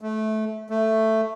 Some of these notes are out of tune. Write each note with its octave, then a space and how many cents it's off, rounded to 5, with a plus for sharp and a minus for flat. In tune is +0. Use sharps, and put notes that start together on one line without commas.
A3 -20
A3 +5